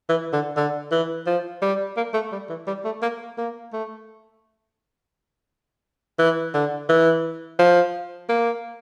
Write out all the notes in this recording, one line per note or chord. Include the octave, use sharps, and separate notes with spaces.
E3
D3
D3
E3
F3
G3
A#3
A3
G3
E3
G3
A3
A#3
A#3
A3
E3
D3
E3
F3
A#3